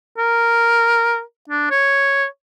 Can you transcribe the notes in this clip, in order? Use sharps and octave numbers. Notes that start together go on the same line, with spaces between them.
A#4
D4
C#5